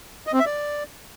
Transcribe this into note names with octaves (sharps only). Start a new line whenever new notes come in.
D#5
C4
E5
D5